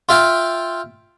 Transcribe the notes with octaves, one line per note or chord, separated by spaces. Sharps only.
F4 E5 F5 G5